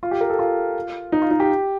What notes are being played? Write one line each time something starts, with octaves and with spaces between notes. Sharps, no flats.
F4
G4
A#4
A4
F4
D#4
F4
D#4
G4